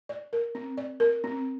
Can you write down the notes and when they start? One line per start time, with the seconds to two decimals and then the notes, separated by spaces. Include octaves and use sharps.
0.09 D5
0.33 A#4
0.55 C4
0.77 D5
1.00 A#4
1.24 C4